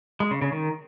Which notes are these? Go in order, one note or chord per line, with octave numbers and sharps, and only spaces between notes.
G#3
C#3
C#3
D#3